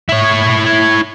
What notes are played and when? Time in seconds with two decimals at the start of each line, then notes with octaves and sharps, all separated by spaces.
0.09 E4 C#5